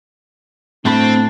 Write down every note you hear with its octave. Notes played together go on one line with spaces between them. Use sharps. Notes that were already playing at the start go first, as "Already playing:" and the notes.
A2 A3 C4 D4 B5